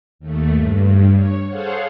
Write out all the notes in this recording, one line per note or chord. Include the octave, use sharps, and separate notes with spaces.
D#2 A3
G2
C#5
G#4 A4 C5 C#5 F5 F#5